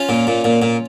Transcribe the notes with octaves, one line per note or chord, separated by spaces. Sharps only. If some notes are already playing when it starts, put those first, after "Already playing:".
Already playing: C#4 F4
A#2
A#2
A#2
A#2